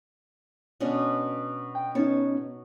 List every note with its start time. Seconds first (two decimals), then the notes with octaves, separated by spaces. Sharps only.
0.80 B2 C#4 D4
1.75 G5
1.95 B3 C#4 D#4 C#5 A5